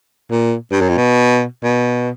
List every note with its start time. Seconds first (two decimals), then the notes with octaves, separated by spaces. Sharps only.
0.31 A#2
0.72 G2
0.81 F#2
0.89 F2
0.97 B2
1.63 B2